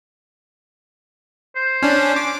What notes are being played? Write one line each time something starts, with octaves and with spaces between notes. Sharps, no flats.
C5
C#4 D4
D6